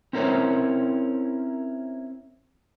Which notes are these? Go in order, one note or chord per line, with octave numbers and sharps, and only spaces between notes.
C4 C#4 E4 A#4 C5 C#5